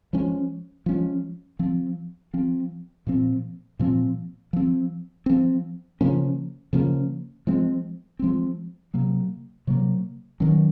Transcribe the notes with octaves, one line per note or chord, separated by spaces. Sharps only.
F3 G#3 C#4
F3 G#3 C#4
F3 C4
F3 C4
A#2 F3 C4
A#2 F3 C4
F3 C4
F3 C4
C#3 F3 A#3 C#4
C#3 F3 A#3 C#4
F3 G#3 C4
F3 G#3 C4
C3 F#3 A#3
C3 F#3 A#3
D#3 F#3 C#4